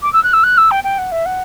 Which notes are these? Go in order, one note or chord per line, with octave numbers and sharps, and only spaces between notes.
D6
E6
F#6
E6
F#6
E6
G5
G5
F#5
E5
F#5